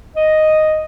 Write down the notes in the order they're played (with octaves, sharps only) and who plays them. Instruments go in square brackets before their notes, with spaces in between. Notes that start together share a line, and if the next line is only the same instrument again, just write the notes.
[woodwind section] D#5